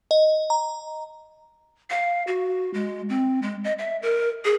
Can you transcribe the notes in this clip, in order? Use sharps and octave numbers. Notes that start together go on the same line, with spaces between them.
D#5
A#5
F5
F#4
G#3
C4
G#3
D#5
E5
A#4
G#4